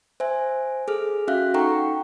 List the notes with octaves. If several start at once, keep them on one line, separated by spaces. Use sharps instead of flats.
C5 E5 G#5
G#4 A4 F6
C#4 F#4 E5 F5 F#6
D#4 A4 F#5 G5 A#5 C#6